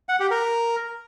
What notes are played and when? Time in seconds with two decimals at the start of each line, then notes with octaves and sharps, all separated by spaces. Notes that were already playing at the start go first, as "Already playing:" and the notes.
0.09 F#5
0.20 G4
0.31 A#4